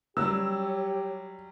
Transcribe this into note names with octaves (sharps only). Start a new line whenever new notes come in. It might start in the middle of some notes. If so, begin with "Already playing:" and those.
F#3 G3 G4 C#5 E6